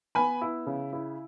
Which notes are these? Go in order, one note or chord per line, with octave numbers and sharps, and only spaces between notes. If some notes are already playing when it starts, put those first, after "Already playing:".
B3 G#5 B5
E4
C#3
E4